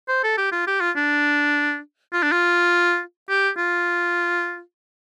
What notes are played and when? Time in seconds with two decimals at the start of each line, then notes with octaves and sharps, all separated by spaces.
0.08 C5
0.24 A4
0.38 G4
0.52 F4
0.67 G4
0.81 F4
0.97 D4
2.13 F4
2.23 D4
2.32 F4
3.29 G4
3.58 F4